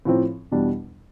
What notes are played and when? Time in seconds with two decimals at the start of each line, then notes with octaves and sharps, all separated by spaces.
0.05 A2 F3 C4
0.51 E2 B2 G3 D4